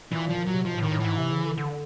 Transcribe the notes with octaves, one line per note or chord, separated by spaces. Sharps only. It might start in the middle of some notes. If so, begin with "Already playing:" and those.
A#2 E3
F3
F#3
C3
B2 F3
G#2
A2
D#3
A2
G#2 E3
C3
C#3
D3
D3